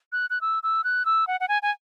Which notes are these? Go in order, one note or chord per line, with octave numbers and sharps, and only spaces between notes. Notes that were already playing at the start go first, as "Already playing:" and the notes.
F#6
F#6
E6
E6
F#6
E6
F#5
F#5
G#5
G#5